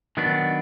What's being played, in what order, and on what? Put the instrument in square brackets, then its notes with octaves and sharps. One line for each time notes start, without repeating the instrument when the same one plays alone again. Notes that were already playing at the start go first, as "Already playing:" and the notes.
[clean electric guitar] D#3 F#3 B3 D4